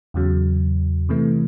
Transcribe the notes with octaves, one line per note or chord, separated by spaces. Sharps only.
E2 C#3 F#3
C3 E3 A3